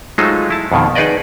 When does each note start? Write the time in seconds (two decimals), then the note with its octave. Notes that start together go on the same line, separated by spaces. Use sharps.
0.18 F#3 G#3 A3 D#4 F4 C5
0.50 E4 A5
0.72 F2 B2 D#3
0.95 D#4 G#4 B4 D5 D#5